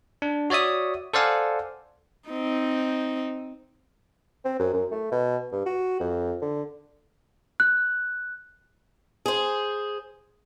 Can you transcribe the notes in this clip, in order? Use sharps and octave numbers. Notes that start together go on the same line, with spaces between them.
D4
F#4 C#5 D5 E5 D#6
A4 C5 D5 F5 F#5 G#5
C4 D#4
C4
F#2
F#2
A3
B2
G2
F#4
F2
D3
F#6
G#4 C5